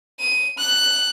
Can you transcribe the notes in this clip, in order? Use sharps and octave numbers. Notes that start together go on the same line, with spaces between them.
D#7
F#6